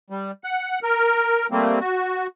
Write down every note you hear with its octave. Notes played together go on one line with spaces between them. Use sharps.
G3
F#5
A#4
G3 A3 A#3 C4
F#4